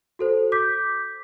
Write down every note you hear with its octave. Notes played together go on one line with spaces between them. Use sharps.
F#4 A4 C5
D6 G6 B6